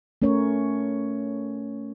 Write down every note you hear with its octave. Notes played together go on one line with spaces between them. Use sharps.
A3 C#4 A#4 C#5